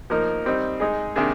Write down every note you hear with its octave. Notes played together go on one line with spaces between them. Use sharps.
F3 A#3 D#4 A#4
G3 C4 D#4
G#3 D#4 G#4
C3 D#3 A#3 D4 G#4